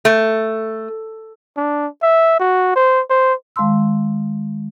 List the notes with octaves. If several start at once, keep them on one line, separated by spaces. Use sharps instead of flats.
A3
D4
E5
F#4
C5
C5
D#3 G#3 F5 A5 C6 E6